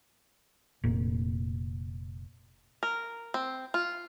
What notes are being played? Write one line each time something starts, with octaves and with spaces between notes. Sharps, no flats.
F1 A#2
A#4
C4
F4